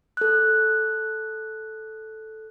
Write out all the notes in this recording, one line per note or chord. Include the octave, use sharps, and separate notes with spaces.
A4 F#6